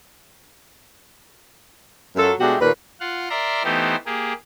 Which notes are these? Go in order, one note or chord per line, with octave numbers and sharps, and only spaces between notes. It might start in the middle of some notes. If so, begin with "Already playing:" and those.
F#2 F#3 F4 A4
B2 G#3 A3 D4 F#4 G4
D#2 A#2 B4
F4 F5 F#5
A#4 D5 E5 A#5 C6
E3 A3 B3 D#4 G4 C5
A#3 G4 G#4